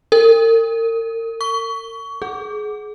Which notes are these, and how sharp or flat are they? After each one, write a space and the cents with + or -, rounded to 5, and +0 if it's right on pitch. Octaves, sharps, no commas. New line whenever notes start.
A#4 -40
C#6 +25
G#4 +25